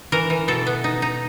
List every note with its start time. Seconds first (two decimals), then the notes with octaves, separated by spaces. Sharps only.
0.12 E3 A#4
0.30 E3
0.48 B2 A4
0.67 B3
0.84 D#4
1.02 D#4